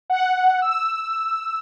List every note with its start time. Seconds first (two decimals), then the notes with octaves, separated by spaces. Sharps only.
0.10 F#5
0.62 E6